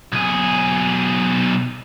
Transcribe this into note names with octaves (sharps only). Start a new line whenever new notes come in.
B1 G#4